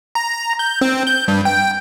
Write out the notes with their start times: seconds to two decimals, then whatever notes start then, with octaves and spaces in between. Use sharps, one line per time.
0.15 A#5
0.59 G6
0.81 C4
1.07 G6
1.28 G2
1.45 G5